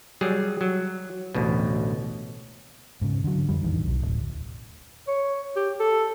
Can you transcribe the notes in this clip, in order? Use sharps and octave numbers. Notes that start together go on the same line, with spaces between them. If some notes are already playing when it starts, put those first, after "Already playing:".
F#3 G3 G#4
F#3
A1 D2 B2
G#2 C#3
D3 F#3
F2 G3
A1 E2 D#3
B1
D1
C#5
G4
A4